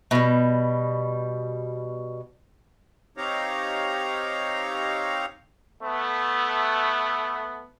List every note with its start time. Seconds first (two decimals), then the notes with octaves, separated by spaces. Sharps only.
0.11 B2 G3
3.17 C4 D#4 G4 C#5 F5 A#5
5.82 A3 B3